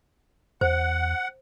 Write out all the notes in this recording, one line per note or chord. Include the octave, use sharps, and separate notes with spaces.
E2 C5 F#5